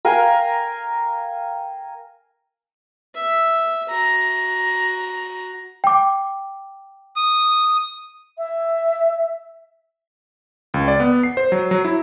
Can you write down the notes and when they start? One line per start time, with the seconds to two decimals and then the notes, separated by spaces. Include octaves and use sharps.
0.05 A#4 F5 G5 G#5
3.15 E5
3.90 F#4 A#5
5.84 G5 D6
7.16 D#6
8.38 E5
10.74 C#2
10.88 D5
11.00 B3
11.23 C7
11.37 C5
11.52 F#3
11.71 F#3
11.85 E4